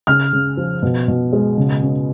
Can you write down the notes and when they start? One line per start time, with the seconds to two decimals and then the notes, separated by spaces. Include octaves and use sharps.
0.07 C#3 F6
0.33 C#3
0.57 F3
0.82 B2
1.08 B2
1.33 G#3
1.58 C#3
1.82 C#3